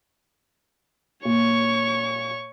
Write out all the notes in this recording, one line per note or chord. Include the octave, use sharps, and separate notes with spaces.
A#2 C#5 C#6